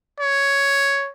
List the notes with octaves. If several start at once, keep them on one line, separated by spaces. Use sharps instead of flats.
C#5